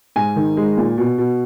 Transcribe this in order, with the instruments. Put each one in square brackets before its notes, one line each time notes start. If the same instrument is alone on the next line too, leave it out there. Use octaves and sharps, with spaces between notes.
[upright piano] G#2 G#5
D#3
G#3
A#2
B2
B2